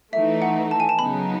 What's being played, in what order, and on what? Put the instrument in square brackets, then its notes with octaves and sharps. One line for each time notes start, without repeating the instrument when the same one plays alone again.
[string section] E3 A3 D#4 [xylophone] E5
[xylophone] F#5
A5
G#5
A5
[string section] C#3 F#3 B3 D#4 [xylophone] B5